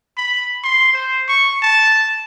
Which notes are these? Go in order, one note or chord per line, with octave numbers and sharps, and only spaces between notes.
B5
C6
C5
C#6
A5